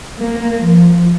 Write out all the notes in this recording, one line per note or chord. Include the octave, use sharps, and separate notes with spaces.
A#3
F3